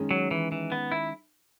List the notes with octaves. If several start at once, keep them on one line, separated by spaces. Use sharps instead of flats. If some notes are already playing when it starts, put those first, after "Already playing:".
Already playing: D#3 G#3 C#4
F#3
E3
E3
B3
E4